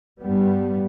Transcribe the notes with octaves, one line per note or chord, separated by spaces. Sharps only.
G2 G3 B3